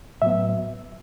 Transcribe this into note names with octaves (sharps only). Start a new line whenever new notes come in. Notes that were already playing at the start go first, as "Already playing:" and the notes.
A2 F#3 B3 E5